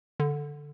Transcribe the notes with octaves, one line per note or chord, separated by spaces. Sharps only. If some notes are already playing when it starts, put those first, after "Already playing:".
D3